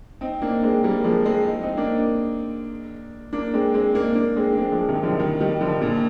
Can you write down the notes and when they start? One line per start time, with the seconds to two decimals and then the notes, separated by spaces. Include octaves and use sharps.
0.21 C4 D#4
0.42 A#3 D4
0.63 G#3 C4
0.84 G3 A#3
1.04 F3 G#3
1.25 G#3 C4
1.46 D#4
1.63 C4 D#4
1.77 A#3 D4
3.33 A#3 D4
3.54 G#3 C4
3.74 G#3 C4
3.94 A#3 D4
4.15 A#3 D4
4.36 G#3 C4
4.52 D4
4.57 G#3 C4
4.72 F3 G#3
4.89 C3 D#3
5.03 D3 F3
5.19 D#3 G3
5.41 D#3 G3
5.61 D3 F3
5.81 A#2 D3